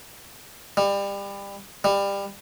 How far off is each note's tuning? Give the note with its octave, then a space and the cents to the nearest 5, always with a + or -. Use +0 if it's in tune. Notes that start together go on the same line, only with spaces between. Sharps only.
G3 +30
G3 +25